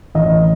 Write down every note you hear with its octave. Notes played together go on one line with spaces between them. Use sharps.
A1 D#5